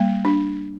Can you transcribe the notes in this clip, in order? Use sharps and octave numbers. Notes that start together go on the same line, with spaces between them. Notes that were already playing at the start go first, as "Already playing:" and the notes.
Already playing: G3 A#3
D4